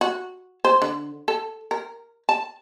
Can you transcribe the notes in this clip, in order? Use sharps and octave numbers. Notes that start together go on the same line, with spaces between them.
F#4
C5
D3
A4
A#4
A5